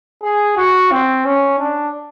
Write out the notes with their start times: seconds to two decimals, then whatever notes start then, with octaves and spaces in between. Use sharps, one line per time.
0.23 G#4
0.57 F#4
0.91 C4
1.25 C#4
1.59 D4